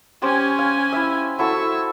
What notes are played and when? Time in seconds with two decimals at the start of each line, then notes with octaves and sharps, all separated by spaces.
0.22 C#4 G4 C5 G#5
0.59 F5
0.93 E4 E5
1.39 E4 F#4 A4 C#6 E6